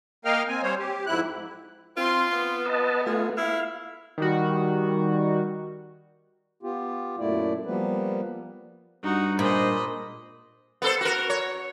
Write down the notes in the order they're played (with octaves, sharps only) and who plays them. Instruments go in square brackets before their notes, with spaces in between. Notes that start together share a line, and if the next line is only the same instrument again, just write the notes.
[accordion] A#3 A#4 D#5 F5 G5 F6
C4 G#5
G3 C5 C#5
G4
F2 G#2 E4 F#6
[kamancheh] C4 C6 [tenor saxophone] F4
[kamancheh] B3
[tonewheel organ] B4 D#5 A5
[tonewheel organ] A3 F4 [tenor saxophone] G#4
[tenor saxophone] E4 [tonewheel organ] F5
[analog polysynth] D#3 G3 F#4
[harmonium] B3 F4 G4
F#2 A#2 A3 E4 D5
F3 G3 A#3 B3 B4
[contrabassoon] G2 [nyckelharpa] D#4 F#4
[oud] A#2 [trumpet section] G#3 C5 [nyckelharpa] D#5 B5
[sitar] B3 A4 C5
F#4 A#4
C#5